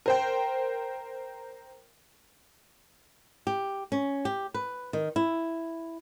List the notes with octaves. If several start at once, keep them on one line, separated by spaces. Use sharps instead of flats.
A#4 C5 G5
G4
C#4
G4
B4
D#3
E4